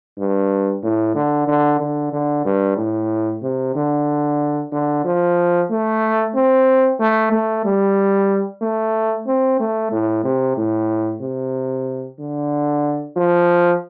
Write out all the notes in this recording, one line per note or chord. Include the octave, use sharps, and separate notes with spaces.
G2
A2
D3
D3
D3
D3
G2
A2
C3
D3
D3
F3
A3
C4
A3
A3
G3
A3
C4
A3
A2
C3
A2
C3
D3
F3